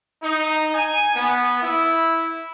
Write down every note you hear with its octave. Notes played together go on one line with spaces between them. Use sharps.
D#4
G#5
B3
E4